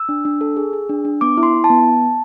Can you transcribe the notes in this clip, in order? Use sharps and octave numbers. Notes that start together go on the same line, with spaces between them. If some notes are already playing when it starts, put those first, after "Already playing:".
Already playing: E6
D4
D4
A4
G#4
G#4
D4
D4
B3 D6
E4
C6
E4
A5
B3